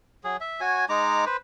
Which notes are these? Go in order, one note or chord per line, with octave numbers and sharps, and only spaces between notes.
F#3 G#4
E5
F#4 C#5 G#5
G#3 D#4 A#5 D6
B4 C5